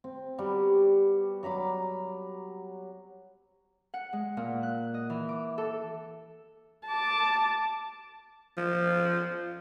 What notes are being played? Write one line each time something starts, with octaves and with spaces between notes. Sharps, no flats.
C4
G3 B3 F#4 G4
F#3 A#5 B5 D6
F#5
G#3
A#2
F#6
D#5
E3
D6
A4
A5 D6
F3